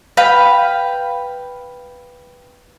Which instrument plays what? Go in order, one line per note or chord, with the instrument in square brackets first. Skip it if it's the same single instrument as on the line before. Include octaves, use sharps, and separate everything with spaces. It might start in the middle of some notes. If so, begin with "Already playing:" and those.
[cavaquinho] B4 F5 G5 B5